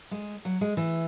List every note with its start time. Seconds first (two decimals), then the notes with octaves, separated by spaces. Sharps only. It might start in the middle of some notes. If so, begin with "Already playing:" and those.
0.11 G#3
0.45 F#3
0.61 G#3
0.77 E3